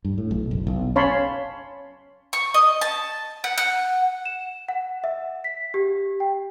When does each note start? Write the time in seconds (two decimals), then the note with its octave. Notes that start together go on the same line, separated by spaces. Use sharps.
0.05 G2
0.18 A2
0.31 B1
0.51 F#1
0.67 B1
0.96 C#4 C#5 F5 A5 B5 C6
2.33 C#6
2.54 D#5
2.81 A5
3.44 F#5
3.58 F#5
4.25 E7
4.69 F#5
5.04 E5
5.44 B6
5.74 G4
6.20 G5